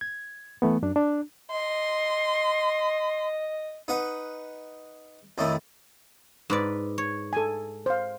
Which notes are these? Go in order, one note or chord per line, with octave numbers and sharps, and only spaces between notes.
G#6
E3 A3 B3
F#2 D4
D4
D#5 C6
D#4 B4 F#5
F2 A2 D#3 E4
G#2 B4 D5
C#5
A4 G#5
C5 F5